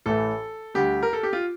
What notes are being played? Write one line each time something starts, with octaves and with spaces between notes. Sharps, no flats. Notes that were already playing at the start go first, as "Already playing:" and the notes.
A1 A2 E3 A3 A4
D2 D3 G3 G4
A#4
A4
G4
F4